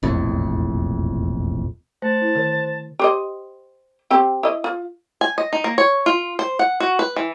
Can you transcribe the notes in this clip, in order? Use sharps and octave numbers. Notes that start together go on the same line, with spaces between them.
E1 A#1 F2 A2
A3 C5 A5
E4
D3 D#3 A#4
G4 C5 D#5
C4 G4 G5
E4 D#5
F4
G#5
D#5
D#4
A#3
C#5
F4
C5
F#5
F#4
B4
E3